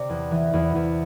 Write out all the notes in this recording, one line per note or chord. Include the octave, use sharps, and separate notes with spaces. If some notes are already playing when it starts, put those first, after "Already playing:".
Already playing: C3 D5
E2
E3
E2
E2